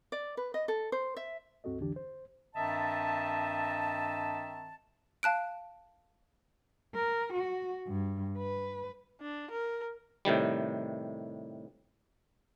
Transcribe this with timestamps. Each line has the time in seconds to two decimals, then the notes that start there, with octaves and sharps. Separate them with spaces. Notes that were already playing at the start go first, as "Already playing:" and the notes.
0.12 D5
0.37 B4
0.54 D#5
0.68 A4
0.92 C5
1.17 E5
1.64 C#2 G2 C4 F#4 A4 D#5
1.80 C2 F2 D3 E3 D4 G4
1.96 C5
2.55 G2 D#3 C4 D#5 E5 A5
5.23 F5 A5 F#6 D7
6.94 A#4
7.33 F#4
7.87 G2
8.38 B4
9.21 D4
9.51 A#4
10.25 A2 C3 D#3 G3